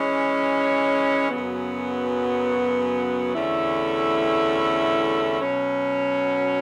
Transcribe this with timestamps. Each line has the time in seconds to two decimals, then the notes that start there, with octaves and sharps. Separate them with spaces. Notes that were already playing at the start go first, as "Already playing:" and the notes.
Already playing: E3 G#3 C#4
1.30 F#2 C#3 F#3 B3
3.34 E2 D3 A3 C#4 E4
5.40 B2 F#3 C#4